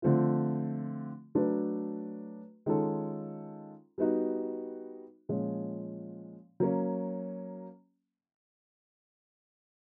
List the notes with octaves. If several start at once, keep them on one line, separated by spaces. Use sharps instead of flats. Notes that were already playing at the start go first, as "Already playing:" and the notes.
D3 F3 A3 C4 F4
F#3 A3 D4 F#4 B4
D#3 G#3 C#4 F4 A4
G3 B3 D#4 F#4
A#2 F3 G#3 C#4
F#3 A#3 C#4